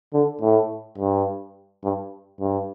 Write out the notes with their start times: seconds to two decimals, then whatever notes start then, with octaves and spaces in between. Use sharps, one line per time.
0.14 D3
0.41 A2
0.98 G2
1.84 G2
2.41 G2